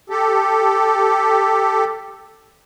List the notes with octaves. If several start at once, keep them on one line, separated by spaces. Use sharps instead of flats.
G4 A4